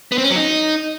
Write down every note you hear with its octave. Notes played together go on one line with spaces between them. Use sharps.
B3
C4
C#4
F#3
D#4